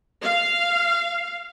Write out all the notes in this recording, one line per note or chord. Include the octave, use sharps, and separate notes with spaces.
F5